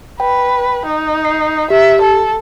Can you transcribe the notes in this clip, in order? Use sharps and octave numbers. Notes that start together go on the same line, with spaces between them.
B4 G5
D#4
C7
G4 E5
A4